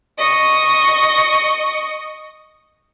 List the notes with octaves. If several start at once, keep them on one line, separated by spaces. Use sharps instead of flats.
D#5 C#6